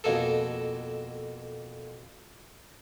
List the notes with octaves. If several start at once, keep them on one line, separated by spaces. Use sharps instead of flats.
F2 B2 A#3 G#4 A4